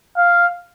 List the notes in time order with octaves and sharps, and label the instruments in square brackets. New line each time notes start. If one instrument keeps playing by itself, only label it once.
[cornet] F5